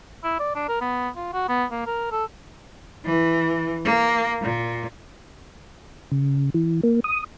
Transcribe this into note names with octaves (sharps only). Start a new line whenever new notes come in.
E4
D5
D4
A#4
B3
F4
F#4
B3
A#3
A#4
A4
E3
A#3
A#2
C#3
E3
A#3
D#6